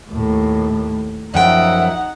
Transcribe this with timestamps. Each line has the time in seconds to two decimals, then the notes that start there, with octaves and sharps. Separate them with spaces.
0.11 D#2 A2
1.34 F#2 F3 D#4 E5 F#5 G5